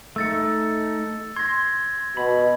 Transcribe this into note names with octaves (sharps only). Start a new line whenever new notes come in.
A3 D#4 E6 A6 C#7
C6 G#6 A#6
B2 B5